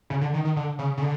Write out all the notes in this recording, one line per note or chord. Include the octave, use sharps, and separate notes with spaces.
C#3
D3
D#3
D#3
D3
C#3
C#3
D3